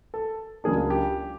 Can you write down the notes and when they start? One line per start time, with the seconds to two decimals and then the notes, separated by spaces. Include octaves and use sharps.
0.14 A4
0.64 C#2 C#3 F#3 A#3 D4 G#4
0.90 G4